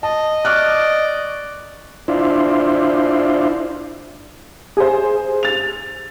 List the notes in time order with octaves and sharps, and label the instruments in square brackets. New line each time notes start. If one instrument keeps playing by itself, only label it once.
[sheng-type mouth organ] D#5 [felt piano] A5
[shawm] D5 [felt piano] C#6 F6 F#6
[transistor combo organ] D4 E4 F4 C5
[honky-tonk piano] G#4 C5
A6 F7